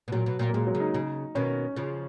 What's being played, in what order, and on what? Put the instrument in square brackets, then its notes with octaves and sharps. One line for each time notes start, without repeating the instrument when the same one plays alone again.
[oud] B2
[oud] A#2 [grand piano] F#3
[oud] B2
A#2
[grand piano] A#3
[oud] A#2 [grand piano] G#3
[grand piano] F#3
[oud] C#3
[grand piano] D#4
[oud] C#3
[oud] B2 D#3 [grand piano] C#4
[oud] C#3 F3